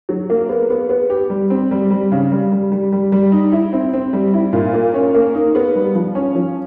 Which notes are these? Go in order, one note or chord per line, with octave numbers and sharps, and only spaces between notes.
F#3
A#3
B3
B3
B3
G4
G3
C4
G3
G3
C#3
G3
G3
G3
G3
G3
D#4
E4
C4
C4
G3
E4
A#2
A#3
C#4
A#3
D#4
B3
G3
F3
C#4
F3